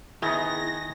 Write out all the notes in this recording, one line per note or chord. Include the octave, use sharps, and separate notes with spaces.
D#3 B3 E4 G#4 D#5 A#6